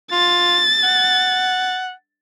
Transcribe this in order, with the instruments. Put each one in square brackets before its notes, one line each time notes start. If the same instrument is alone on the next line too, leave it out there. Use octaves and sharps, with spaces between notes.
[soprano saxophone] F4 [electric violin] A6
[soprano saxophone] F#5